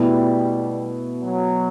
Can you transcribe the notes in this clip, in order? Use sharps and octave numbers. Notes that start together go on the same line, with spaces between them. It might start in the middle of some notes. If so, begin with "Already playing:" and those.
Already playing: B2 G3 A3 E4
F#3